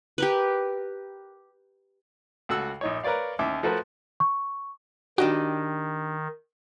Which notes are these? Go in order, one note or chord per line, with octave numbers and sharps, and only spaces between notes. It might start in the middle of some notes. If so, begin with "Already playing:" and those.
G4 A#4 B4
C#2 F#4 A4 F#5 E6
A#1 D#4 C#5
A#4 B4 C#5 D5 F5
D#2 C#4 E5 D6
F3 A3 F#4 A#4 B4
C#6
D#3 D4 D#4 F#4 G4